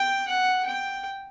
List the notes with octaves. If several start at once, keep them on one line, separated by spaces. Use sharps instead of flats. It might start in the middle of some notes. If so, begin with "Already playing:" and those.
Already playing: G5
F#5
G5